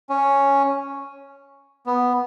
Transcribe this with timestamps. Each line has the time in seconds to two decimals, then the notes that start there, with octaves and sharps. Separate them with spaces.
0.10 C#4
1.86 B3